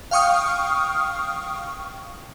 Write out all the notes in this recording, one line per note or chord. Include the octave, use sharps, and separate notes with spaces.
F5 G5 C#6 D#6 F6